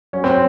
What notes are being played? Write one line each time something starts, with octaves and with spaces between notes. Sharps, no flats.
F#3 C#4
C4